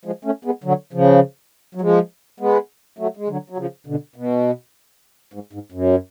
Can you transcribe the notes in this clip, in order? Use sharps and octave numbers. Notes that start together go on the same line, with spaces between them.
F3 G#3
A3 C#4
G#3 B3
D3 F#3
C#3 F3
F#3
F3 G#3
G#3 B3
F#3 A3
G#3
D3 F#3
F#3
C#3 F3
B2 D3
B2
G#2
G#2
F#2